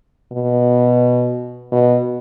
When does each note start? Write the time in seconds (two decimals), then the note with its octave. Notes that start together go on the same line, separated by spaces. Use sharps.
0.32 B2
1.72 B2